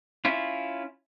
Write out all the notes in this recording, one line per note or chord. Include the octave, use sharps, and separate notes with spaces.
C#4 E4 F4